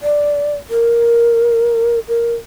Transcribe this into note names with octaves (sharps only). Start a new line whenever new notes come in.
D5
A#4
A#4